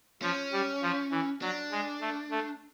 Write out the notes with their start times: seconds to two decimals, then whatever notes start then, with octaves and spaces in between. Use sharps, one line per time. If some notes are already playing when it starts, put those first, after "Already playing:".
0.22 F3 C#4
0.52 G3
0.82 F3
1.11 E3
1.42 F#3 D4
1.71 G#3
2.01 A3
2.31 A3